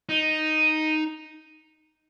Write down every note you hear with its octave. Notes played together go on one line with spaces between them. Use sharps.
D#4